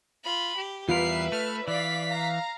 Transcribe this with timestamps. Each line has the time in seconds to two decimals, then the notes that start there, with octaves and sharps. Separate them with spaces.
0.24 F4 B5
0.57 G4
0.89 E2 G3 F4 A#4 B4 E5 C7
1.32 A3 F6
1.68 E3 D5 F5 B6
2.10 F5 A#5